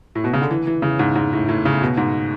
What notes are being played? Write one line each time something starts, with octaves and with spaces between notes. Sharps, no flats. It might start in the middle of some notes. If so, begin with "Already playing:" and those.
A2
B2
C#3
D3
E3
E3
C#3
G#2
G#2
A2
A2
C#3
B2
G#2